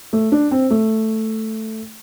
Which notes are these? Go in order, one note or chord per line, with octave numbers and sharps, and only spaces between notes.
A3
D4
C4
A3